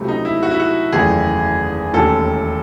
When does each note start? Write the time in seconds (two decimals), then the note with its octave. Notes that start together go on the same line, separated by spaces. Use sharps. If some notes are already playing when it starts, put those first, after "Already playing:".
Already playing: C#2 C3 F#3 A3
0.08 D#4
0.25 E4
0.43 F#4
0.51 E4
0.60 F#4
0.92 F#1 E2 D#3 A3 G#4
1.94 E1 D#2 D#3 A3 C#4 A4